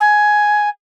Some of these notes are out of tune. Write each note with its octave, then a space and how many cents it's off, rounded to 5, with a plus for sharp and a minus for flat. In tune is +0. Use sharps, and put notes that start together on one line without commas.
G#5 +10